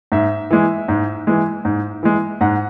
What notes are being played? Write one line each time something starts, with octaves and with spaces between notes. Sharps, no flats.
G#2 E5
E3 G#3
G#2
E3 G#3
G#2
E3 G#3
G#2 F#5